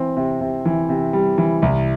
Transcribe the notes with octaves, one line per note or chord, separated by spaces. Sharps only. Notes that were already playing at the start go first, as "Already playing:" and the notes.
Already playing: E3 C4
C3
C3
E3
C3
G3
E3
C2